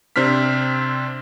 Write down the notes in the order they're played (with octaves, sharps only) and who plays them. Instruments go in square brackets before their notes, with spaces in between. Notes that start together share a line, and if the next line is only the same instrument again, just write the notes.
[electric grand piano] C3 C4 D4 F6 B6